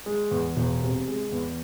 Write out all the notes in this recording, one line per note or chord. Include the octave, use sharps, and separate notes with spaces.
G#3
E2
E1
C3
G#3
E2